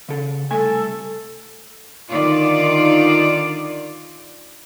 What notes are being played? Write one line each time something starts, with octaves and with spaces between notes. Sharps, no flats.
C#3 A4
C2 A3 A4 G#5
D3 D#3 F4 D5